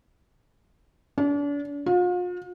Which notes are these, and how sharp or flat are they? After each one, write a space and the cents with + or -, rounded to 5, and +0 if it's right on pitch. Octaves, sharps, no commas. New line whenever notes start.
D4 -40
F4 +40